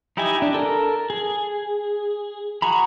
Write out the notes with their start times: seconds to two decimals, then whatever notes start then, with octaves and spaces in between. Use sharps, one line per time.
0.17 D#4 E4 G4 D#5 G#5
0.42 D4
0.54 A4 A#4
1.10 G#4
2.62 F#4 G#4 A#5 B5